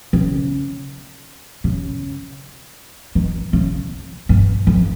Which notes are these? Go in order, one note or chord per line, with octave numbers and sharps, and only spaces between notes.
C#3
C#3
D#3
C#3
G2
F2